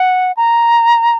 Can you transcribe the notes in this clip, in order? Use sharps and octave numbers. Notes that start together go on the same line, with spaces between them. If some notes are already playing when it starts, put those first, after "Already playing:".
Already playing: F#5
A#5